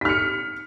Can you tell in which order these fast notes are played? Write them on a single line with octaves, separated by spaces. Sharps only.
B6 F6 C#7